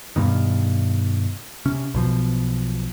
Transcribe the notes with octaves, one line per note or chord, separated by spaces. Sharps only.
G2 B2 D#3
C3 C#4
B1 B2 F3